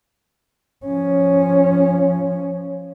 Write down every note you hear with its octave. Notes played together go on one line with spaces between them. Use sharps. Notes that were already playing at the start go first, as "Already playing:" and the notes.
F3 C#4